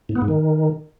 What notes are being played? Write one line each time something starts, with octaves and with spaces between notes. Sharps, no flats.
A2
B3
G#2
D#3